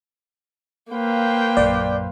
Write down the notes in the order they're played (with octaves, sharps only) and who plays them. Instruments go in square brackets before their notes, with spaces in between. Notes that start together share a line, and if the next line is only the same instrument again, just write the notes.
[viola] A#3 G5 [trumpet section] B4 C5 F5
[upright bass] A#1 F#2 [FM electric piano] D5